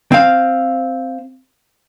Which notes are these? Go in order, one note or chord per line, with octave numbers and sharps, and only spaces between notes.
C4 F5